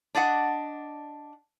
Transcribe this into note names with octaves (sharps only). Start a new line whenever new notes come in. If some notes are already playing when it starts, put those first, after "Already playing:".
D4 D5 D#5 F#5